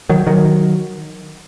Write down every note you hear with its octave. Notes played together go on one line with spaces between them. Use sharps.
D#3 F#3
D#3 F#3